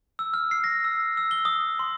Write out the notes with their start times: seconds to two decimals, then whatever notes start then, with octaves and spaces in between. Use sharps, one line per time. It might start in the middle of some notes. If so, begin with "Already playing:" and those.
0.19 E6
0.34 F6
0.51 C7
0.64 A#6
0.84 E6
1.17 E6
1.31 G7
1.45 D#6
1.79 C6